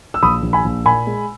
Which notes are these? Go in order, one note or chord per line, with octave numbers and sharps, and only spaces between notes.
E6
A#1 B5 D#6
A#1
G#5 B5
A#1
A#2 G#5 B5
G#3